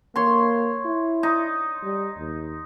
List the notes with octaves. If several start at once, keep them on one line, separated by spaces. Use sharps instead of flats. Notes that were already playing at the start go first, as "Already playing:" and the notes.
A#3 C#5 C6
E4
D#4
G3
D#2